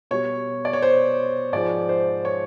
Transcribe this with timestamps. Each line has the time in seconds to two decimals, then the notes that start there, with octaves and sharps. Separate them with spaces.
0.11 B2 G3 C#5
0.65 D5
0.73 C#5
0.82 C5
1.52 G#2 F3 G#3 D5
1.89 C5
2.25 C#5